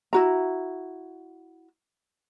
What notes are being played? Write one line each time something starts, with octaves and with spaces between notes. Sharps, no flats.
E4 F#4 A#5